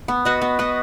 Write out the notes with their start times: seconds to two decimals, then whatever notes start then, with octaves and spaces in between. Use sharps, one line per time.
0.08 B3
0.25 F#4 B4 D#5
0.42 B3
0.59 F#4 B4 D#5